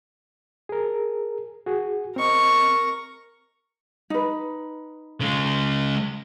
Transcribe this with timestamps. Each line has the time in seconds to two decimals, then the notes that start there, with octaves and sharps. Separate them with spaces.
0.69 G#4 A#4
1.66 F#4 G#4
2.16 C4 A#4 D#5 C#6
4.10 D#4 B4
5.21 C#3 G#3